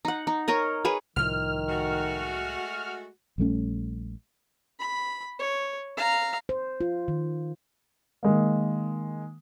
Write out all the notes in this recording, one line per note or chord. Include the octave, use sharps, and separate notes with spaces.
D#4 F#5
D#4
A#4 C#5 D#5
G#4 B4 C#5
C2 A2 D#3 F3 F6
G#3 A3 F#4
A#1 G3 A3 C#4
B5
C#5
F5 A#5
C5
F4
D#3
D#3 G#3 A#3